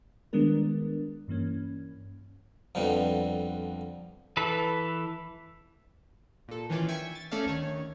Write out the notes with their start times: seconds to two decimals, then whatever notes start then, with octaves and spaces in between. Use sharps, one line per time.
0.33 D#3 G3 G#3 B3 D4 A#4
1.28 G2 E3 A#3 C#4
2.75 F2 D3 F3 G3 B3
4.37 E3 A4 B4
6.48 A#2 A4
6.70 D#3 E3 C#4 F4 D5
6.88 E5 G5 G#5 C#6
7.15 A6
7.31 A3 C#4 A4 D5 F5
7.46 D2 D#3 C#5